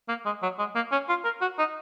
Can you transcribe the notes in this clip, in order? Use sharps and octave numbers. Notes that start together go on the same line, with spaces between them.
A#3
G#3
F#3
G#3
A#3
C#4
F4
A#4
F#4
D#4